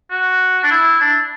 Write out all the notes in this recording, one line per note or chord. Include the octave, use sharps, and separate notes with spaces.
F#4
D4
E4
D4